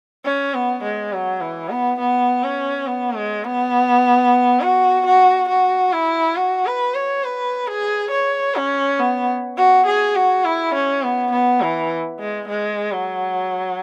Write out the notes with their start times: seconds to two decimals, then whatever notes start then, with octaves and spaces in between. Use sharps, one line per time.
0.25 C#4
0.54 B3
0.83 G#3
1.13 F#3
1.41 E3
1.70 B3
2.00 B3
2.43 C#4
2.87 B3
3.16 G#3
3.44 B3
4.61 F#4
5.06 F#4
5.49 F#4
5.92 E4
6.36 F#4
6.66 B4
6.94 C#5
7.24 B4
7.67 G#4
8.11 C#5
8.55 C#4
8.99 B3
9.57 F#4
9.86 G#4
10.15 F#4
10.44 E4
10.74 C#4
11.02 B3
11.31 B3
11.61 E3
12.19 G#3
12.48 G#3
12.92 F#3